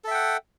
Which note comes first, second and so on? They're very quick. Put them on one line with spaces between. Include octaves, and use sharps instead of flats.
A4 E5 G5 F#5